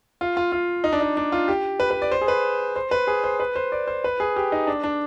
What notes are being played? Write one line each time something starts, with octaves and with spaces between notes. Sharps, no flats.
F4
F4
F4
D#4
D4
D#4
D4
F4
G4
B4
B4
D5
C5
G#4
B4
C5
B4
G#4
C5
B4
C5
D5
C5
B4
G#4
G4
D#4
D4
D4